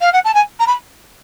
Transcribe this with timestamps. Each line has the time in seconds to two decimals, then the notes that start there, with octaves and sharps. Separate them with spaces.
0.01 F5
0.13 F#5
0.24 A5
0.34 G#5
0.59 A#5
0.67 B5